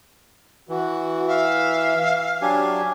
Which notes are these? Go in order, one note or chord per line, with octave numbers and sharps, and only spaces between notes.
E3 F#4
E5 F5
F#3 D4 G4 G#5